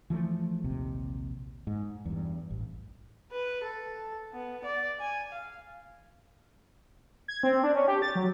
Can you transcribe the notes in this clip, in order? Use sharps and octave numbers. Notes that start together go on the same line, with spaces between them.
E3 F3 G3 A3
A#1 D#2 C3
G#2
E2 G2
A1
B4
A4
B3
D5
G#5
F5
G#6
C4
D4
C#4
G4
A6
F#3